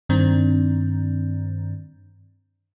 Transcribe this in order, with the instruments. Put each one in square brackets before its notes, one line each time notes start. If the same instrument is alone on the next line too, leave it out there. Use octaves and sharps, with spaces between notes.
[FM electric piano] G2 D#3 C4 D4